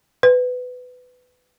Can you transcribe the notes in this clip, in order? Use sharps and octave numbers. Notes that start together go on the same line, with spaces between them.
B4